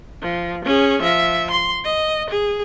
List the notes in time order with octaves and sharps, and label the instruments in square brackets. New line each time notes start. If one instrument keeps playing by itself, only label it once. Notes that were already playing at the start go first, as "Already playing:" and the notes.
[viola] F3
C#4 G#4
F3 E5
C6
D#5
G#4